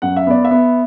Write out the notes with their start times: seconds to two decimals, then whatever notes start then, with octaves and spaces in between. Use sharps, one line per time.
0.02 F#2 F#5
0.16 E5
0.27 B3 D5
0.45 E5
0.51 B3